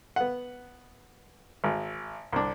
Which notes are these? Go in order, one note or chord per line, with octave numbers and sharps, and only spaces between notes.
B3 F#5
G#1
C2 D4